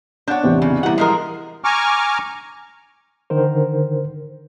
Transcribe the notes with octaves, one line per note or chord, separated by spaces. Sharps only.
D4 C#5 F#5 G6
A1 E2 C3
C#3
A#2 E3 G3 F#5
F3 G#3 A#4
G#5 A#5 C#6 D6 F6
D3 D#3 A#4 C5